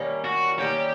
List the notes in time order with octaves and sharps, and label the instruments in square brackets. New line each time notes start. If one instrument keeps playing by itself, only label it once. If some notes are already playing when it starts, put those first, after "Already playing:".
Already playing: [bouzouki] D#3 G3 A#3 C#4
[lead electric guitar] F#4
[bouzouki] D#3 G3 A#3 C#4 [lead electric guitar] G4